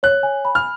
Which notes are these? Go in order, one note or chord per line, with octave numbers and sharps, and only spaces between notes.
C#5 F#6
G#5
B5
F6